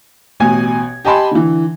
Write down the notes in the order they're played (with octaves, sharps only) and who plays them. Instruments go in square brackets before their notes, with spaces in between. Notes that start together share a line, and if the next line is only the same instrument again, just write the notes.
[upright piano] A1 B2 G#5 G#6
G4 D#5 G#5 A5 B5 C6
D3 E3